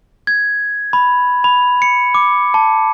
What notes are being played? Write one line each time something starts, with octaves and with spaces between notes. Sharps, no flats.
G#6
B5
B5
C#7
D6
A5